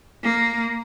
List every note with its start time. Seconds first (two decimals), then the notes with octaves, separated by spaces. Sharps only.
0.23 A#3